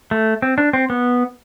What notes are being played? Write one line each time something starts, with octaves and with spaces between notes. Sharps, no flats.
A3
C4
D4
C4
B3